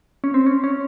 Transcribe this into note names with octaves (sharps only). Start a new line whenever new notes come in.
C#4
C4
C#4
C#4